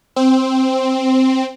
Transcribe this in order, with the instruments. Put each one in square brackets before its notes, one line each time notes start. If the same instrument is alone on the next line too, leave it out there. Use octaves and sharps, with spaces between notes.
[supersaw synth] C4